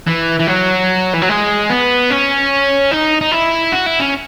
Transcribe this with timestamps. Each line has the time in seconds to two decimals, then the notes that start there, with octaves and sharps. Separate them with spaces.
0.07 E3
0.40 E3
0.48 F#3
1.14 E3
1.22 F#3
1.29 G#3
1.70 B3
2.10 C#4
2.91 D#4
3.21 D#4
3.32 E4
3.72 F#4
3.86 E4
4.00 C#4